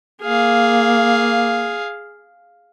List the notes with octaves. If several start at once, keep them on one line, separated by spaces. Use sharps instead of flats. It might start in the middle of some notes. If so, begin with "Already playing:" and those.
A#3 G#4 F5